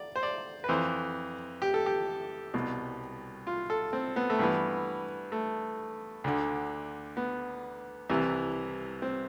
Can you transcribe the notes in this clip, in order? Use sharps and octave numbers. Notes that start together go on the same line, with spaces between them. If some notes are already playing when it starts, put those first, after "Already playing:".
Already playing: D5
C5
D5
B4
F2 E3 C5
G4
A4
G4
C2 B2
F4
A4
C4
B3
A3
G2 E3 B3
A3
D2 D3
B3
C2 C3 E3
C4